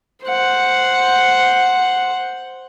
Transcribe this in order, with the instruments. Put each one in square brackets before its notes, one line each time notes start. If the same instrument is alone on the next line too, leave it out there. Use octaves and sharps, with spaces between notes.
[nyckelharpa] C5 F#5